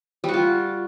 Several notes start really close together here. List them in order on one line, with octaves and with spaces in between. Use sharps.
G3 F#4 F4